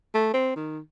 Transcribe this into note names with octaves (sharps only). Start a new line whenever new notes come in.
A3
C4
D#3